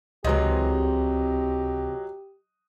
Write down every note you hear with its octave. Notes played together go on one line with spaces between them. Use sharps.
C#2 C3 E3 F#3 G#3 G4 D#5